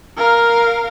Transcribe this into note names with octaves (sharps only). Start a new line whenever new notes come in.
A#4 F5